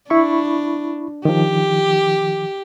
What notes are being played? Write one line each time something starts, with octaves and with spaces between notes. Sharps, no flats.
D4 E4 B5 C#6
D#3 F3 G4